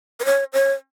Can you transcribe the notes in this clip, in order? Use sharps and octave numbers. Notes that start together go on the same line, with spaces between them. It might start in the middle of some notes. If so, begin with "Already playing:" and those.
B4
C#5
C#5